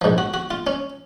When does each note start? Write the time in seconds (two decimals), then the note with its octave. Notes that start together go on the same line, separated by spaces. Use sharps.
0.01 A#1 G#2 F3
0.18 F#4
0.34 F#4
0.51 F4
0.67 C#4